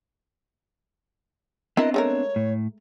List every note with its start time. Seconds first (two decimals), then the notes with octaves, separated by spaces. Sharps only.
1.77 B3 C4 D4 E4 A#4 D#5
1.94 G#3 A3 A#4 C#5
2.36 A2